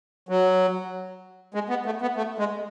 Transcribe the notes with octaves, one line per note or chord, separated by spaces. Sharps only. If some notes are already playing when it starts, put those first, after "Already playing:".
F#3
G#3
B3
A3
B3
A3
G#3